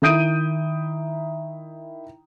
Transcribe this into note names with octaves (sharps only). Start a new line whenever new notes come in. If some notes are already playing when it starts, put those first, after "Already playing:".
D#3 E4 D#6 G6 D7 D#7